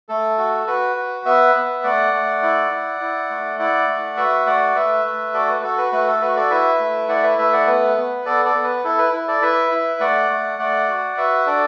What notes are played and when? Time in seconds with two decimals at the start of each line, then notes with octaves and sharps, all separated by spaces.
0.09 A3 A4
0.38 F#4
0.67 F#4 B4
0.96 F#4
1.25 B3 B4 E5
1.55 B3
1.84 A3 D5 F#5
2.13 A3
2.42 E4
2.71 E4
3.00 E4
3.30 A3
3.59 E4 D5 F#5
3.88 A3
4.17 F#4 B4 E5
4.46 A3 D5 F#5
4.75 A3 B4 E5
5.05 A3
5.34 F#4 A4 D5
5.48 B4
5.63 F#4 A4
5.78 B4
5.92 A3 B4
6.07 A4
6.21 F#4 B4
6.36 A4 D5
6.51 E4 B4 E5
6.80 A3
7.09 E4 D5 F#5
7.23 B4 E5
7.38 A3 B4 E5
7.53 D5 F#5
7.67 B3 B4
7.97 B3
8.26 B3 A4 D5
8.45 A4 D5
8.55 B3
8.64 B4
8.84 E4 A4
8.98 B4
9.13 E4
9.28 A4 D5
9.42 E4 B4 E5
9.71 E4
10.00 A3 D5 F#5
10.30 A3
10.59 A3 D5 F#5
10.88 F#4
11.17 F#4 B4 E5
11.46 D4 A4 D5